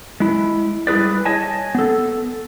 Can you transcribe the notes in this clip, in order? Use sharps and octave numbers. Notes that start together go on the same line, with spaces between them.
G#3 E4
G3 E4 G#4 B4 D5
C#5 D#5 G#5 A5
B3 A4